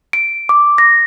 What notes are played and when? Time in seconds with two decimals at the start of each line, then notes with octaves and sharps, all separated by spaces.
0.13 D7
0.49 D6
0.78 A#6